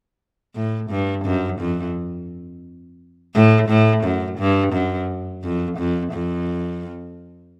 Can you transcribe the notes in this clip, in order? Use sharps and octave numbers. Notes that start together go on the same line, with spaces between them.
A2
G2
F#2
F2
A2
A2
F#2
G2
F#2
F2
F2
F2